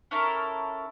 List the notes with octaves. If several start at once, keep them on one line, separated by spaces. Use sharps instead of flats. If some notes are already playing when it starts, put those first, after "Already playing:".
C#4 E4 A4 A#4